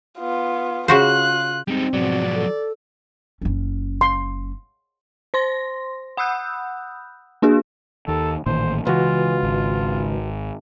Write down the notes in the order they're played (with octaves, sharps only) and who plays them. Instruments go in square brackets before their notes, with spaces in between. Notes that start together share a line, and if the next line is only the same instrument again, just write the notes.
[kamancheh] B3 F4
[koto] C#3 F#4 C5 [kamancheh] F4 F#6
[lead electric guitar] G3 D#4 [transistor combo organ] G#3 [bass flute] C4
[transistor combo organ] G#2 B2 F#4 [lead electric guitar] F3 F#3 [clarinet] D5
[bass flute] A4
[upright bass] F#1 C#4
[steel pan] C6
[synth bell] C5 C6 A#6
F#5 B5 D#6 E6 F#6 G6
A#3 D4 F#4 G#4
[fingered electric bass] D#2 D#3 [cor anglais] A4
[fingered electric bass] A1 A#2 D#3 [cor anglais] C5
[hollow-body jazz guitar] C#2 [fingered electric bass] E3 [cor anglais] F4 [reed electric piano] F#4 B4
[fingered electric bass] G#1